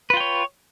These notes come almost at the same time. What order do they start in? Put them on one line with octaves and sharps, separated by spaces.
B4 F4 G5 C#5